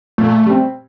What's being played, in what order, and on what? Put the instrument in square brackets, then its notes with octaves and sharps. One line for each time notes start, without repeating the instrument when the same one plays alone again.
[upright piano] A#2 [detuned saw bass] A3
[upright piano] G3 C4